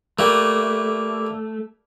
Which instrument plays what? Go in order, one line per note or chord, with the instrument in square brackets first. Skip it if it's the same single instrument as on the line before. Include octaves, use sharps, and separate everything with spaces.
[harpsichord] G3 A#3 [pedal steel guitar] A3